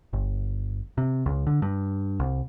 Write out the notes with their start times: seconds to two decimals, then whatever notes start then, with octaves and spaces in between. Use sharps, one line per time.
0.13 G1
0.98 C3
1.26 C#2
1.47 D3
1.62 G2
2.20 C2